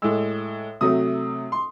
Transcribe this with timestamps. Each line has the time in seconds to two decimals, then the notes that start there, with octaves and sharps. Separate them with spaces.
0.02 A2 G#3 E6
0.81 C3 F#3 A3 D#6
1.52 C6